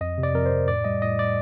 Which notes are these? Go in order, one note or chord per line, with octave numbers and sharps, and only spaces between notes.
F2 D#5
C3
D5
F2 A#4
C5
F2
A2 D5
G3 D#5
A2 D#5
A2 D5